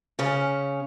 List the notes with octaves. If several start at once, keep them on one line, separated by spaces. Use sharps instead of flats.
C#3 C#4